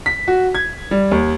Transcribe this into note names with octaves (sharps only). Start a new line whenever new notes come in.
B6
F#4
G#6
G3
D#2